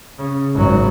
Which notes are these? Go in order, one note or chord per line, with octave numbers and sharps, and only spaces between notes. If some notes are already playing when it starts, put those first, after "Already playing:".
C#3
G#1 F#3